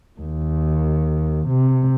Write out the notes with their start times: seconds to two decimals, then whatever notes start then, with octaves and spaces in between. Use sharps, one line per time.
0.20 D#2
1.49 C3